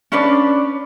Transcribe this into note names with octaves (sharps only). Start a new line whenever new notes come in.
C#4 D4 B4 D5